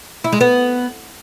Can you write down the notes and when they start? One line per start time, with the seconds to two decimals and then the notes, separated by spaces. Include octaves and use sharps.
0.24 E4
0.32 G#3
0.41 B3